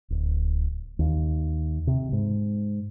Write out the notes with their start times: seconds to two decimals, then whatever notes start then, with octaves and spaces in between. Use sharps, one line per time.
0.10 D1
0.99 D#2
1.87 C3
2.12 G#2